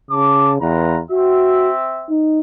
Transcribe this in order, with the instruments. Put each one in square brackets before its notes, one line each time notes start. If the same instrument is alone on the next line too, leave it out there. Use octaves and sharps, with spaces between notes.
[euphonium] C#3 [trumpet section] A5 D6
[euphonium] E2 [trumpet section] F4 B4 A#5
[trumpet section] C4 E5 [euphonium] F#4
[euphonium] D#4